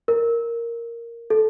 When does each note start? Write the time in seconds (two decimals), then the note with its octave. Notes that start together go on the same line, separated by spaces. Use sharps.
0.08 A#4
1.30 A4